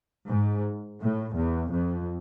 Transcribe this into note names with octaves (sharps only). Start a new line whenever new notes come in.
G#2
A2
E2
F2